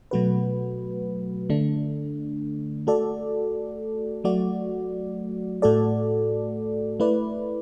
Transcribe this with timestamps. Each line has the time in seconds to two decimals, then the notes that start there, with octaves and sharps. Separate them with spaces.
0.11 B2 F#3 A3 F#4 B4
1.50 D3 A3 D4
2.87 A3 F#4 A4 D5
4.24 F#3 A3 F#4 D5
5.62 A2 A3 F#4 A4 D5
7.00 A3 E4 B4 D5